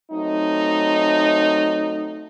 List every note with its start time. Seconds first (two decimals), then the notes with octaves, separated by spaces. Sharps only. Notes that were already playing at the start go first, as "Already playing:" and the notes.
0.11 F#3 A3 C4 D#4